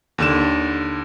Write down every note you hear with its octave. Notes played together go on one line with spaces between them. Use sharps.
D#2 D3 E7